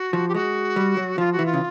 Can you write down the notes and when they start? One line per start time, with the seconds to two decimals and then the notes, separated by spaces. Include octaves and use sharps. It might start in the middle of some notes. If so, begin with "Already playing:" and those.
Already playing: F#4
0.13 F3
0.28 G4
0.34 G#3 F#4
0.76 G3
0.97 F#3
1.18 F3 F4
1.32 F#4
1.39 E3
1.45 F4
1.53 C#3